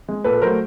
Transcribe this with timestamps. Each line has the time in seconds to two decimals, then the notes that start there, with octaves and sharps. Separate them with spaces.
0.09 G#3
0.24 A#2 A4 B4
0.42 F#3 A3 A#4 C5